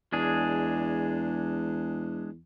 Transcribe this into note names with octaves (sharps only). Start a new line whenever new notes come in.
E2 G#3 D4 G#4